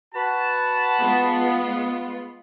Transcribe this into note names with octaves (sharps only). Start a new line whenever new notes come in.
F#4 B4 A5
G#3 B3 F4